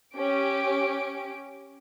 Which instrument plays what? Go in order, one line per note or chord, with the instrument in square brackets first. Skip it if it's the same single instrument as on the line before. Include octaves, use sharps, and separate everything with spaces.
[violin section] C#4 G4 D7